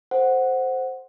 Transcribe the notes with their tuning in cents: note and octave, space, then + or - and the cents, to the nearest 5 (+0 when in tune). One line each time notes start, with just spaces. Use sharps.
A4 -15 C5 +0 F#5 +0